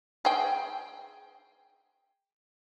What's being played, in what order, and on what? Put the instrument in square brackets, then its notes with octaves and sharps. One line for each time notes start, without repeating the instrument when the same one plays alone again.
[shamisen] G#4 G5